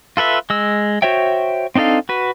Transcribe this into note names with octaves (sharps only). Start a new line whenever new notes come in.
F4 A4 B4 E5
G#3 E6
F#4 C5 C#5 E5 G5
C4 D4 D#4 A4 F5
F#4 B4